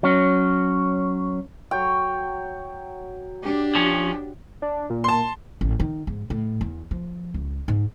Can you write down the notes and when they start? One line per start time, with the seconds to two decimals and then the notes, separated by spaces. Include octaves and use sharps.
0.03 F#3 C#4
1.71 F#3 C#5 G5
3.42 D4 G4
3.75 F3 C#4
4.62 D4
4.90 A#2
5.04 A5 C6
5.61 A1
5.80 D#3
6.07 G#2
6.30 A2
6.61 E2
6.91 F3
7.34 C#2
7.68 G#2